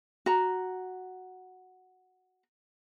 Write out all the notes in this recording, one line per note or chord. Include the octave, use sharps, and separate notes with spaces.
F#4 A#5